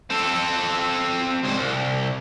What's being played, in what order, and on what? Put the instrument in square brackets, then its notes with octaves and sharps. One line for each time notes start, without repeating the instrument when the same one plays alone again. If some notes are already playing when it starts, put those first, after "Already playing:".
[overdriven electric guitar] C4 A4
C#2 C5
C2